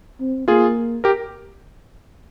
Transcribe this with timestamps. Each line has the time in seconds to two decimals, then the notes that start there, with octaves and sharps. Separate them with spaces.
0.20 C4
0.48 A#3 F4 G#4
1.04 G4 A#4